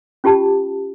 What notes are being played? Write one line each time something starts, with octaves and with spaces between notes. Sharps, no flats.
C#4 F4 G4 A5